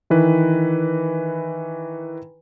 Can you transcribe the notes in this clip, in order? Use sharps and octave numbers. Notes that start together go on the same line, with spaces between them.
D#3 E3 B4